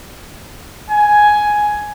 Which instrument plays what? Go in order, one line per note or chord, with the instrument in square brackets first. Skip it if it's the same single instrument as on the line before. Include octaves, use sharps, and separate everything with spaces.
[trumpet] G#5